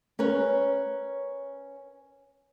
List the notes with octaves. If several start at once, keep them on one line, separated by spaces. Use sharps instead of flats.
C#4 A#4 B4 C#5